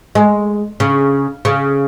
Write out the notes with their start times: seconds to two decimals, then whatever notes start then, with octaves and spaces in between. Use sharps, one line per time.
0.15 G#3
0.80 C#3
1.45 C#3